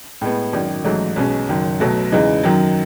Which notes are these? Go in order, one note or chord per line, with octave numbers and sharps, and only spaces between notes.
A2 G#3 B3
G#1 F#2 D#3
A1 G#2 F#3 A3 D#4
B1 B2 G#3 C#4
F#1 F#2 D#3
B1 B2 F#3 A3
E2 C#3 E3 G#3 D#4
F#2 D#3 F#3